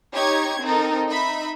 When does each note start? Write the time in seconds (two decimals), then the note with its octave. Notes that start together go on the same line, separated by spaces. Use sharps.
0.13 D#4 G4 C#5 C#6 G#6
0.61 C4 D#4 A4 A#4
1.09 D#4 E5 B5